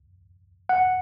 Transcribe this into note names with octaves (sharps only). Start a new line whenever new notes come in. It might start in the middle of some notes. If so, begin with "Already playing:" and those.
F#5